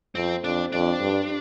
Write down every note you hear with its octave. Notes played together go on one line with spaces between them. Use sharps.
F2 C4
F2 D4
F2 D4
G2